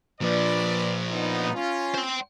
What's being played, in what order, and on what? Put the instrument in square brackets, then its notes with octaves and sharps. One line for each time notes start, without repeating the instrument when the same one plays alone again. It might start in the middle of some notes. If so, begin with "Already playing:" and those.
[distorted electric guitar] A#2 F3 [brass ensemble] B4 D5
[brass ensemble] B3 D#4
C#4 F4
[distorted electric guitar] C5 G5